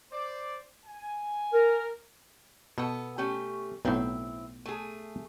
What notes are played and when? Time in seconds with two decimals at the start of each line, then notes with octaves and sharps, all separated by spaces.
0.12 C5 D5
0.85 G#5
1.52 A#4
2.78 B2 B3 A4
3.18 A3 C#4 G4
3.85 B1 A2 C4 E4
4.65 A3 G#4